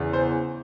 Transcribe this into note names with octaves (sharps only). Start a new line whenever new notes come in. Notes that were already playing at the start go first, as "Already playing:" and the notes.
Already playing: E2 C#3
C5